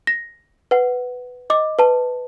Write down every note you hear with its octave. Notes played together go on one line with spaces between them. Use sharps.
A#6
B4 F#5
D#5 D6
B4 A5